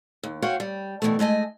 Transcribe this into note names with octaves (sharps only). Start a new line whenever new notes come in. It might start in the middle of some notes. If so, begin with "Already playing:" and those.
D#2
F#4 C5 C#5 F5 G5
G3
B2 D#3 E3 G3 A3
G#3 A3 D#5 G#5